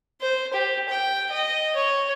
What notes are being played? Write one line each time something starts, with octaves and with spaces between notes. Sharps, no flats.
C5
G4
G5
D#5
C#5